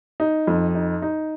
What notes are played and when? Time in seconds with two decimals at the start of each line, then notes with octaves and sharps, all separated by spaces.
0.20 D#4
0.47 F2
0.75 D#4
1.02 D#4